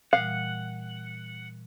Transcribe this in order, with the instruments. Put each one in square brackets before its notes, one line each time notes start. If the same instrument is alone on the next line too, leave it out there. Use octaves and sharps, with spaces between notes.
[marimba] A#2 E3 G3 [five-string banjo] F5 [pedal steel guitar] F#5